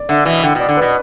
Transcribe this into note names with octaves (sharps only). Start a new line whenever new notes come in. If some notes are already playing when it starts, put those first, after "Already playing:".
Already playing: D5
D3 E5
B2 E3 E5
D3 G5
B2 D5
D3
B2 B4